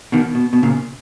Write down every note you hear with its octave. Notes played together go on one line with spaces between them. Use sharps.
B2 D#3
B2
B2
A#2 C#3